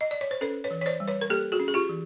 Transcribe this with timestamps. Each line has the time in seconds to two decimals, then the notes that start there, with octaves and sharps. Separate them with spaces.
0.01 D#5
0.11 D5
0.21 C#5
0.31 C5
0.41 C#4 A4 B4
0.64 B4 C#5
0.71 E3
0.81 C#5
0.86 C5 D5
1.00 G3
1.08 B4 C#5
1.21 A#4
1.30 A#3 G4 A4
1.52 F#4 G#4
1.60 C#4
1.68 G#4
1.74 F4 G4
1.89 E3